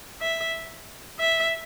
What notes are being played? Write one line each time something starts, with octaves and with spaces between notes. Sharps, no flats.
E5
E5